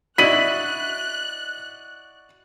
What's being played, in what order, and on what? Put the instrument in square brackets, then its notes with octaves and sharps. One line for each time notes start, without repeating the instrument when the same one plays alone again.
[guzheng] E4 [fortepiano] F#4 D5 D#5 [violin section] F#6 [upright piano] B6 D#7 F#7